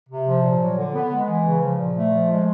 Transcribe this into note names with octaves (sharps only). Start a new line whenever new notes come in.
C3
F3
A#2
F#3
D3
B3
G#3
E3
C#3
F3
A#2
A3
F3
G#3